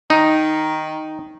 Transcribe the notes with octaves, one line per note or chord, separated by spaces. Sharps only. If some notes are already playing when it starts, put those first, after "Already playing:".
D#3 D#4